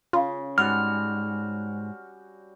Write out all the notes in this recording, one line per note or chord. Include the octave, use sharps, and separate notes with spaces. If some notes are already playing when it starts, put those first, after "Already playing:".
C#3 F4
G#2 G3 F#4 F6